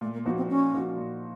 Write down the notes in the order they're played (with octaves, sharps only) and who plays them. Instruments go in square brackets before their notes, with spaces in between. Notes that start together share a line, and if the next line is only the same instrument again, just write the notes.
[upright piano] A#2 [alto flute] A3
[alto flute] A#3
[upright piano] F3 A#3 D#4 F#4 [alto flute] B3
[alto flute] C4
[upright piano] A#2 [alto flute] C#4
[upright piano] F3 A#3 D#4 F#4
A#2